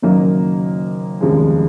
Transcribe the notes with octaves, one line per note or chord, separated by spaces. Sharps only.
F#1 F#2 D#3 F#3 A#3
F1 D#2 C#3 F3 G#3